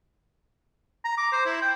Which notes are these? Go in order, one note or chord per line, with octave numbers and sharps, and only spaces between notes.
A#5
D6
C5
E4
G5